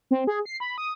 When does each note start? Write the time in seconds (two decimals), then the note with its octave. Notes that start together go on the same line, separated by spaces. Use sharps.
0.11 C4
0.27 G#4
0.45 C7
0.60 B5
0.78 D#6